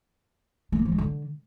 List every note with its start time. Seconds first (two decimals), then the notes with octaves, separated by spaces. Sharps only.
0.72 A3
0.79 A#3
0.85 F3
0.92 G#3
0.98 D3